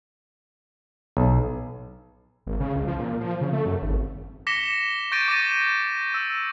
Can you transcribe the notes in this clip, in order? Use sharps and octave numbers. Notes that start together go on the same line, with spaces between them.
B1
G#1
C#3
C#2
F3
A#2
F3
C#3
A3
F#2
G#1
D6 A#6 B6 C#7 E7 G7
C#6 G6 A6 A#6 D7 D#7
D6 A6 A#6 D#7
E6